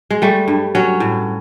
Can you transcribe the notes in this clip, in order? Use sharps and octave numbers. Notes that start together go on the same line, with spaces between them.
G#3
G3 A3
G2
F#3 C#4
A2